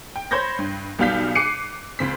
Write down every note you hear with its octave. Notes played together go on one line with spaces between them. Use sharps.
G5
C5 C#5 B5 G6 G#6 A#6
G2
B1 B2 G3 F5 G6 B6
D6 F#6 C7 C#7 D#7
C#2 C4 B6